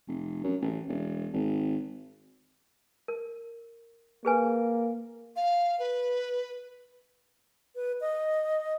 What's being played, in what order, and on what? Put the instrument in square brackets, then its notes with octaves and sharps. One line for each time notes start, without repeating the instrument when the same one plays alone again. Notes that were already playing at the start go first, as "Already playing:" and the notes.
[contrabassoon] F1
F#2
A1
E1
G#1
[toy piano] A#4
[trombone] A#3 [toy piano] G#4 B4 G#5
[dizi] F5
B4
[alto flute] B4
D#5